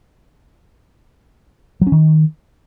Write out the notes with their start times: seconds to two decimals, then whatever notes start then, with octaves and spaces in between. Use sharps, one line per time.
1.81 F#3
1.87 C#4
1.92 D#3